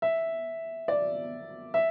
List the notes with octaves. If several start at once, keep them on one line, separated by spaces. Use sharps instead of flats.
E5
D5
E5